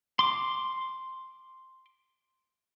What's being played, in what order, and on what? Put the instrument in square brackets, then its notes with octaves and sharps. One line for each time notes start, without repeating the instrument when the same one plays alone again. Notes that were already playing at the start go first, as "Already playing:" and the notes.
[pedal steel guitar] C6 D6